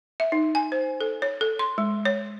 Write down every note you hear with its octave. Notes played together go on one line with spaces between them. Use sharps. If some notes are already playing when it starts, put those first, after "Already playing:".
E5
D#4
G#5
C5
A4
C#5
A4
C6
G#3
C#5